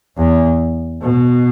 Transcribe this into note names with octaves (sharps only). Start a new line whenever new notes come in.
E2
B2